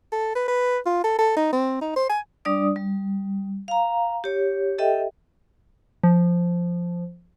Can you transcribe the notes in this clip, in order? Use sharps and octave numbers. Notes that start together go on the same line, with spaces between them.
A4
B4
B4
F4
A4
A4
D#4
C4
D#4
C5
G#5
G3 D4 D5 D#6
G3
F5 A#5
G4 C#5
G4 A4 D#5 E5 G5
F3